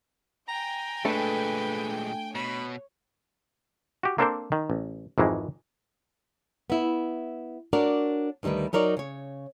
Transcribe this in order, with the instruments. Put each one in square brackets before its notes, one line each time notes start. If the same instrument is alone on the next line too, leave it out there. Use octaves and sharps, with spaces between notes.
[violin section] G5 G#5 [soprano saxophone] A#5
[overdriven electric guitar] A#2 G#3 [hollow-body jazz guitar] A3 D4 A4 [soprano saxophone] B4
[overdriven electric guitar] B2 [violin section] C#5 [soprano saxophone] B5
[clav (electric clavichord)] F#4 G4
A#3 C4 D4 A4 A#4 C5
D#3
A1
G#1 F2 D#3 E3 G#3
[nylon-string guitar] B3 E4
D4 F#4 A#4 C#5 D5
D2 D#3 G3 D#4 B4
F#3 D#4 A#4 C#5 D5
C#3 C#5